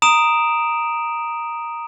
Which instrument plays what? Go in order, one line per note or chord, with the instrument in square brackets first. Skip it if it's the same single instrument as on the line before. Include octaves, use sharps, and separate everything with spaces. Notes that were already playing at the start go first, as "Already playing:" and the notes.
[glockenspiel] A#5 D#6 D7 E7 F7